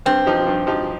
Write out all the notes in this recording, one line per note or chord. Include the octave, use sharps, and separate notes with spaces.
G2 C4
F3 D#4 G4
G2
F3 D#4 G4